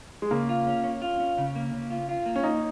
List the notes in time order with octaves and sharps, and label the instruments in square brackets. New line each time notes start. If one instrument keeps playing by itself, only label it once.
[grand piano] G#3
[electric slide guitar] C#3 [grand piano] A#3
[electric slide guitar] F4
C#4
C#4
F4
C#4
C#3
A#3
C#3
F4
F4
A#3
[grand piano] C#4
[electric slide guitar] A#3 [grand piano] D#4